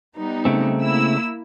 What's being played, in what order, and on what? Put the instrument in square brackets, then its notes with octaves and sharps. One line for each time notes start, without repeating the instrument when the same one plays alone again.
[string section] G3 B3 D#4
[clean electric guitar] C#3 A3 C4
[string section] A#3 E4 E6